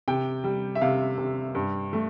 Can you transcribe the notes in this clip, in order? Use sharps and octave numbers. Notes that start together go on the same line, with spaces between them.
C3 G5
G3
E5
C3 F5
C3
G2
A3